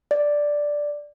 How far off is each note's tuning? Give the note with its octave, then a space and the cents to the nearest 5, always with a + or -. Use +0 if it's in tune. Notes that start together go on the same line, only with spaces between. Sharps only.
D5 +0